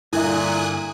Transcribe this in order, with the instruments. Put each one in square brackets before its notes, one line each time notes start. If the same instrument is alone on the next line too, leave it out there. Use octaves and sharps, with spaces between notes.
[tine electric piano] G2 D3 [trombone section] A#2 [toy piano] E4 E5 [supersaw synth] G#5 D#6 F#6